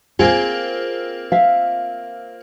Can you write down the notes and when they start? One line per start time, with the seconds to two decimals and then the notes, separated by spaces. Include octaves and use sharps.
0.19 A#3 C4 F4 G#4
1.32 E5 F5